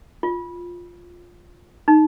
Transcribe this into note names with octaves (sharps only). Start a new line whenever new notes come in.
F4
D#4